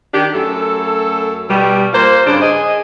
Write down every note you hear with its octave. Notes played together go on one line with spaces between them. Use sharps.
D#3 D4 G4
F#2 A3 A4
B2 G3
A#3 F4 C5
G2 C#3 D4 C5
G#4 D#5